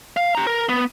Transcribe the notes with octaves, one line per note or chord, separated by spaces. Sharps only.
F5
G4 A#5
A#4
B3